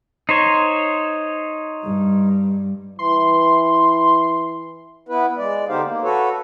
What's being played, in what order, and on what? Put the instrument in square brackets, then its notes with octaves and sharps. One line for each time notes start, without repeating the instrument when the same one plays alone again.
[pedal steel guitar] D#4 C5 C#5
[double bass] G2 G3
[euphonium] E3 [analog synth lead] C6
[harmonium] B3 E4 B4
G#3 D5
D3 B3 D#4 G4 C5 F5
A#3
F#4 A4 B4 C#5